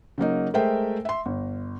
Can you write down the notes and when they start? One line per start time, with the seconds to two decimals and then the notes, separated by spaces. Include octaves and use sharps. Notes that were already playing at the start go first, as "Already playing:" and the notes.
0.18 C#3 F#3 A#3 D#4
0.54 G#3 A3 A#4 C5 E5 G5
1.05 E5 C6
1.26 G1